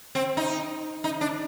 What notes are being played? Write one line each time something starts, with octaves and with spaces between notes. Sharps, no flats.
C4
D#4
D#4
D4